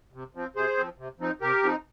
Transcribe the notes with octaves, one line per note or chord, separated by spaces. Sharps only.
C3
F3 C4
C3 G#4 C5
F3 C4
C3
F3 C4 D#4
C3 G4 A#4
F3 C4 D#4